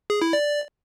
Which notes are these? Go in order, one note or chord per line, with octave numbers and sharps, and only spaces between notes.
G#4
E4
D5